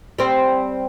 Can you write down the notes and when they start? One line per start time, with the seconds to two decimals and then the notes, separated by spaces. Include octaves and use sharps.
0.19 G3 C4